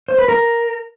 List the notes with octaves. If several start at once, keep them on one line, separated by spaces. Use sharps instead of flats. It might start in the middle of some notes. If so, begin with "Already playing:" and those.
C5
B4
A#4